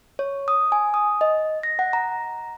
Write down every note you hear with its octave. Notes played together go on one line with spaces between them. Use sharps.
C#5
D#6
G#5
D#6
D#5
A#6
F#5
A#5